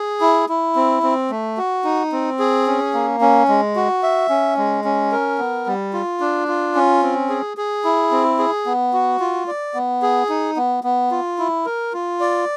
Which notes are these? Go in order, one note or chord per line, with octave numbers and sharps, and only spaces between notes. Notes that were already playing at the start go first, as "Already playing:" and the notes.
Already playing: G#4
E4
E4
C4
C4
A3
F#4
D#4
C4
G#4
C#4
A#3
C#4
G#3
F#4
E5
C#4
G#3
C#4
A#4
B3
G3
F4
D4
F4
C#4
C4
G#4
G#4
E4
C4
G#4
B3
F#4
F4
D5
B3
G#4
D#4
B3
B3
F4
E4
A#4
F4
D5